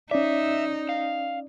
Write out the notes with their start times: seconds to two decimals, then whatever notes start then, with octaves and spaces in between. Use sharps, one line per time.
0.11 C#4 D#4 D5 E5
0.89 F5